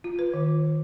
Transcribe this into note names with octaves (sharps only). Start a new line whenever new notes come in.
F4
B4
D#3